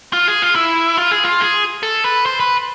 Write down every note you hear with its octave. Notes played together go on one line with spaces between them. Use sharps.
F4
G#4
F4
E4
F4
G#4
F4
G#4
A4
B4
C5
B4